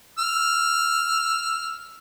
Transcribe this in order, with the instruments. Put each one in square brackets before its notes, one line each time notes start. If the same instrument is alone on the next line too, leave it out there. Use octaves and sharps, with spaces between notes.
[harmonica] E6 F6